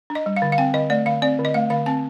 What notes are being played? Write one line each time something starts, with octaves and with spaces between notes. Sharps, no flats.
D4
D#5
G3
F5
D3
F5
C4 G5
D3 D#5
A3 D5
D3 F5
C4 D5
D3
D#5
A3 F5
D3 F5
C4 A5